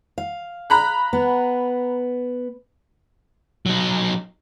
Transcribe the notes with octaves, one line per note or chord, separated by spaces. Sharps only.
F5
A#5 B5 F#6
B3
F#3 D#4